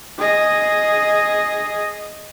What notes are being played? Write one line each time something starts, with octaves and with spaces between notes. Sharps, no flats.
G#4 D#5